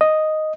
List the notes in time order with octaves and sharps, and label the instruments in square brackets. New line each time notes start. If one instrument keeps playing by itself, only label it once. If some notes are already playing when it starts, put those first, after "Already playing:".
[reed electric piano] D#5